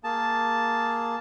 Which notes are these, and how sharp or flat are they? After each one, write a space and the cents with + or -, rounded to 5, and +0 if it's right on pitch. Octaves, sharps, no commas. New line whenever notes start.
A#3 +0 G#4 +0 A5 +0